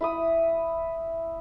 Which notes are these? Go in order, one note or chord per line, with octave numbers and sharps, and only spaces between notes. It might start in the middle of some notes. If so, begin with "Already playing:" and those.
E4 B5 D#6